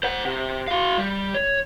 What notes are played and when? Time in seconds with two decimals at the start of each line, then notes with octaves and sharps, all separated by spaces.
0.03 C5 F#5
0.25 C3
0.68 F#4 F5
0.97 G3
1.34 C#5